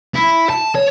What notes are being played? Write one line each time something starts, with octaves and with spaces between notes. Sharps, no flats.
E4
A5
C#5